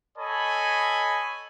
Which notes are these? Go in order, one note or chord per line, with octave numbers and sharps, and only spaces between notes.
A4 C#5 D#5 G#5 B5